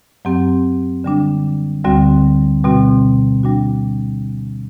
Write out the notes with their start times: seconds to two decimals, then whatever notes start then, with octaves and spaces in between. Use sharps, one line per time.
0.25 F#2 F#3 C4 G4
1.04 D3 G3 D4
1.84 D2 D3 G3 C4 F#4
2.64 B2 G3 C4 F#4
3.43 G3 D4 F#4